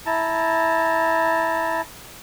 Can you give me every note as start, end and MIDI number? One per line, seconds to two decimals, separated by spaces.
0.06 1.81 64
0.06 1.81 81
0.06 1.81 82